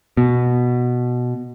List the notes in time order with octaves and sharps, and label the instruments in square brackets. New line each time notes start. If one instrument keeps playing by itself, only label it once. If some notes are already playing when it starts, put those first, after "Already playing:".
[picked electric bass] B2